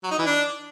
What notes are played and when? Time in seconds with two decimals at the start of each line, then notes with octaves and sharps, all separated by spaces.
0.03 F#3
0.11 D#4
0.18 E3
0.26 D4